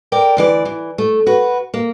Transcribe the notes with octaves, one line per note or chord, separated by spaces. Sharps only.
A#4 D5 G5
D2 E3 D5
E3
A3
F#4 B4
A#3